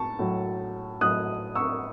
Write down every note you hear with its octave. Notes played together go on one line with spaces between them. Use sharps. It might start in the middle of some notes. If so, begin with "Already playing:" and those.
Already playing: A2 A5 C#6
A2 F#3
A2 F#3 D#6 F#6
C#6 E6